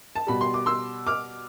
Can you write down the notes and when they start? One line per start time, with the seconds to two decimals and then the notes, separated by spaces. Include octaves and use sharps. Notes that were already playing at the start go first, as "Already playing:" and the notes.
0.16 A5
0.27 B2 G3 B5
0.41 C6
0.54 D6
0.66 C6 E6
1.07 D6 F6